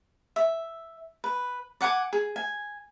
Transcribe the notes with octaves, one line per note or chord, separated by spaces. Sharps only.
E5
B4
D5 F#5 G#5 D6
G#4
G#5